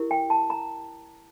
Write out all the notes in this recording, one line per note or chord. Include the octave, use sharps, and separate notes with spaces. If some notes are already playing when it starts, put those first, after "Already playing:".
Already playing: E4 G4 A#4
G5
A5
A#5